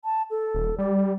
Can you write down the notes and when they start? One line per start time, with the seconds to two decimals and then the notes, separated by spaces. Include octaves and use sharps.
0.05 A5
0.30 A4
0.54 D#1
0.78 G3 D5